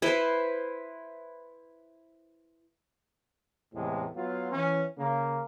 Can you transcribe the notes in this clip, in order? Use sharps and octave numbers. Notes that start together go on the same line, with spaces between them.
E4 B4 C5
E2 A2 C3 G#3
F#3 B3 F4
E3 C#4
C#3 A#3